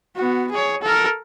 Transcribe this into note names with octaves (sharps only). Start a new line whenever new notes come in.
B3 F#4
G#4 C#5
A4 A#4